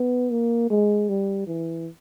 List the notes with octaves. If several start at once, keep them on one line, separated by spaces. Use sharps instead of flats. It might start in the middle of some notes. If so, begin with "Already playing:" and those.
Already playing: B3
A#3
G#3
G3
E3